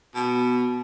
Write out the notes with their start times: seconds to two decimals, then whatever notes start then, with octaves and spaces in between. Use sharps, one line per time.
0.15 B2